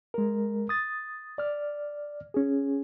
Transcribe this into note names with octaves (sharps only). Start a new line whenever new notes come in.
G#3 A#4
D#6 A6
D5 F6
C#4 G#4